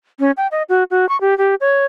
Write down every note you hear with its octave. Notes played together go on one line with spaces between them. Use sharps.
C#4
G5
D#5
F#4
F#4
C#6
G4
G4
C#5